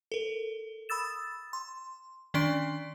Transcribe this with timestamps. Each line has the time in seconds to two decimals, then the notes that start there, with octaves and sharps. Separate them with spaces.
0.12 A4 A#4
0.89 B5 D#6 E6 A6 E7
1.53 C6
2.34 D#3 C#4 D4 D5 C6 D7